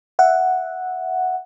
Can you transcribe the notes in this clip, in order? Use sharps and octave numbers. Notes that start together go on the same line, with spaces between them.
E5 F#5